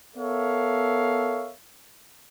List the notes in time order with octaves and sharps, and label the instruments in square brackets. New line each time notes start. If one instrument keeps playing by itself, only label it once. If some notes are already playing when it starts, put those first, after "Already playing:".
[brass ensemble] B3 A4 A#4 C#5 E5 F5